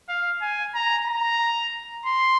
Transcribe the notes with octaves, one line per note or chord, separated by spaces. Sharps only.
F5
G#5
A#5
A#5
C6